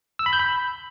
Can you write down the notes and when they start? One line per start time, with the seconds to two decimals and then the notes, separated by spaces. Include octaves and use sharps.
0.19 E6
0.26 B5
0.33 G6
0.39 B5